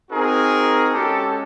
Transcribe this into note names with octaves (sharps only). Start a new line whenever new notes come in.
C4 D#4 F#4 G#4 A#4
G#3 C#4 F#4 G4 A4